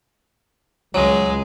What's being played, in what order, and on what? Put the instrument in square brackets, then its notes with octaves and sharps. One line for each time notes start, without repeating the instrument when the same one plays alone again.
[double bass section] C#2 [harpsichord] F#3 [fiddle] G#3